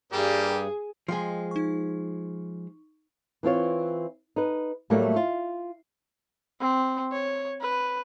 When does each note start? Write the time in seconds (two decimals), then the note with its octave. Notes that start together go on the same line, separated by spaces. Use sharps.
0.12 G2 G3 A#3 G4 G#4
1.08 F3 G#3 D#5 G5 C6
1.51 D#4 C#6
3.43 E3 C4 F4 C#5
4.36 D#4 B4
4.90 A2 F#3 G3 A3 A#3
5.16 F4
6.60 C4
7.12 C#5
7.61 B4